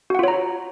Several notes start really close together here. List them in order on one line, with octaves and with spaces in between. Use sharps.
F#4 F#5 F4 C#5 A#5